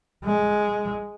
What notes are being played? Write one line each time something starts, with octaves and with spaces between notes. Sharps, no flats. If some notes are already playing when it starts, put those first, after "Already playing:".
G#3